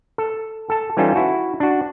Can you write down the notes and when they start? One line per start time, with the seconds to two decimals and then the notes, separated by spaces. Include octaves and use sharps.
0.18 A4
0.70 A4 A5
0.97 E3 G3 C#4 D#4 F4 A4
1.16 E4 F#4
1.60 D4 F#4